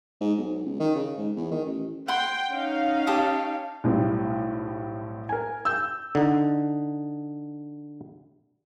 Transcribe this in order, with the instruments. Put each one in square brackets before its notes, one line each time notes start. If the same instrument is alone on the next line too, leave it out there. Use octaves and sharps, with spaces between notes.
[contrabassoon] G#2
B1
C#2
D#3
C#3
G#2
E2
D#3
A1
[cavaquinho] F#5 C6 [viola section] G5
[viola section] C#4 D#4 F5
[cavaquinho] G4 A5 D#6
[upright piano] B1 A2 G3 C4
A#4 G#5
E6 G6
[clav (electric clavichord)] D3 D#4